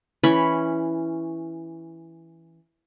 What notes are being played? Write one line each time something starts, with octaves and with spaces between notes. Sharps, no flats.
E3 C#4 C#5 B5